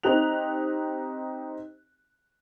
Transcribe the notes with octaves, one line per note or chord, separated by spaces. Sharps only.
C4 D#4 G4 F#6 F7